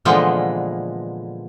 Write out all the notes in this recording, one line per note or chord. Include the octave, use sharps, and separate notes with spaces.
A#2 D3 E3 F3 G#3 B3